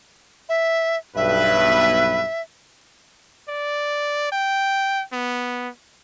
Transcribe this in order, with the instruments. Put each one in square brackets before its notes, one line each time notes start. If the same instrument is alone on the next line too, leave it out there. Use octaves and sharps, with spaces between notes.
[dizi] E5
[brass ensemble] B1 G2 B4 [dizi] E5
[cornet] D5
G5
B3